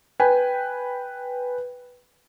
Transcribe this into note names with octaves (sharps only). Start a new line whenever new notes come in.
B4 G5 G#5